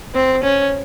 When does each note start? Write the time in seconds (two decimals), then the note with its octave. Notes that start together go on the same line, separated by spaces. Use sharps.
0.14 C4
0.43 C#4